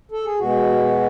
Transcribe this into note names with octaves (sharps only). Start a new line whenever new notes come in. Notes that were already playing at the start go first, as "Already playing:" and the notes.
A4
G#4
B2 G#3 F#4